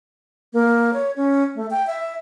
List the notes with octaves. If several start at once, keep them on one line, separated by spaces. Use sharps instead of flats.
A#3
C#5
C#4
A3
G5
E5